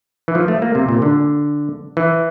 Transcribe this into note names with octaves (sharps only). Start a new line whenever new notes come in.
E3
F3
A3
A#3
C3
A#2
D3
E3